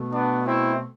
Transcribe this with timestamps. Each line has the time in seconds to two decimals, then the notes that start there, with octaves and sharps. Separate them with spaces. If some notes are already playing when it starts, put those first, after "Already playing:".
Already playing: B2 A3
0.13 B3 D4
0.46 C4 E4